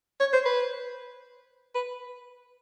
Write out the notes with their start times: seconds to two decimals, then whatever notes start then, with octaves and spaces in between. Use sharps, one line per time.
0.20 C#5
0.33 C5
0.45 B4
1.75 B4